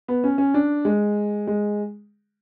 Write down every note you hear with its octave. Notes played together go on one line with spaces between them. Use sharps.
B3
C#4
C#4
D4
G#3
G#3